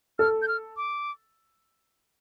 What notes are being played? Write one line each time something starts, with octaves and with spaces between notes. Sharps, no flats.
A4 F6
G6
F6
D6